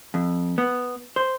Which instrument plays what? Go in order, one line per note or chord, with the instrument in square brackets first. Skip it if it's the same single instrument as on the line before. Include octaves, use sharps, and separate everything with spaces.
[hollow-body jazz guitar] F2
B3
C5